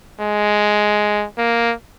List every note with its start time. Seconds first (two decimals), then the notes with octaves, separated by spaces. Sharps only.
0.20 G#3
1.38 A#3